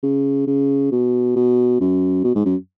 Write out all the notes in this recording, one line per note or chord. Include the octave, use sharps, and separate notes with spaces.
C#3
C#3
B2
B2
F#2
B2
G#2
F#2